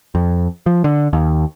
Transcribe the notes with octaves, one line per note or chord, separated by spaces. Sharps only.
F2
F3
D3
D#2